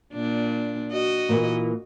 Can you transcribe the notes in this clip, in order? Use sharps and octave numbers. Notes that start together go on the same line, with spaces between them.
A#2 D4
F#4 D#5
A#2 E3 A#3